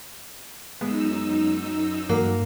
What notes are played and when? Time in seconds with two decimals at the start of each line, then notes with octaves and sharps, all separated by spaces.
0.81 F#2 G#3 B3 D#4 E6
2.09 G2 F#3 A#3